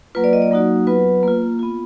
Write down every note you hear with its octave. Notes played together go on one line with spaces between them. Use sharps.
F#3 A#3 F4 B4
D5
D#5
D5
F#3 A#3 D#4 F#4
F#3 B3 F4 B4
A#3 F4
B3 F4